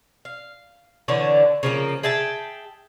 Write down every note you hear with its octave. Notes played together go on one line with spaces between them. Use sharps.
F5
D3 E3 D4 C#5
C#3 F3 A#3
G#4 E5 G5 A5